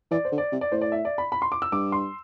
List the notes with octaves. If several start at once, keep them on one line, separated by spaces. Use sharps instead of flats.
E3 D5
C5
D3
D5
C3
D5
A2 C5
D5
E5
D5
B5
B5
C6
D6
E6
G2 D6
C6